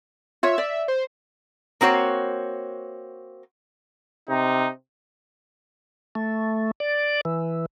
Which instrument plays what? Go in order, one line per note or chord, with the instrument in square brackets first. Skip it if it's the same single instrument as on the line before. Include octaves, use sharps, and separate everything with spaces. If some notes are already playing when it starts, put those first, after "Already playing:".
[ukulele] F4 C#5 [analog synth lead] E5
[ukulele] D5
[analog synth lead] C5
[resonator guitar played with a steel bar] A#3 C4 F#4 C#5
[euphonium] C3 [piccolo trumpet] D#4
[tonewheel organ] A3
D5
E3